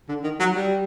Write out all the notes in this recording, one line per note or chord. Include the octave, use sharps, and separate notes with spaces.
D3
D#3
F#3
G3